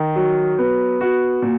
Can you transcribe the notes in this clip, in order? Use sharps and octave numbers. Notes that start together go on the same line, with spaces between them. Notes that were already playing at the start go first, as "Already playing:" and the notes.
Already playing: D#3
F#3
B3
F#4
A#2